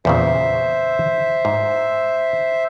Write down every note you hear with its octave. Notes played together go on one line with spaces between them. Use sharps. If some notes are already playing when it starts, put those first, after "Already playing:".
E2 A#2 C#3 C5 E5
G#2